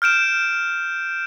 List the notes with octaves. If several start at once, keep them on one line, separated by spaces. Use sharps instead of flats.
F6 G6 D7 E7